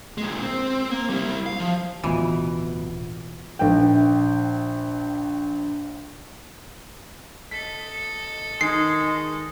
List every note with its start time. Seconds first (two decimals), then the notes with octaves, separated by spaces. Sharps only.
0.18 A#2 G#3
0.43 C4
0.91 A#3
1.10 G3 E4
1.46 F5
1.60 F3
2.04 D1 B2 E3 F4
3.59 A#1 G5
7.51 A4 D#5 B6
8.61 D#3 G#3 D#4 C7